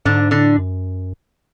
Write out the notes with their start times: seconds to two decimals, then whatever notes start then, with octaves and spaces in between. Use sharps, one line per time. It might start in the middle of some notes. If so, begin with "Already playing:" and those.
0.05 G#2 D3 D4
0.31 A2 D3 D4
0.58 F#2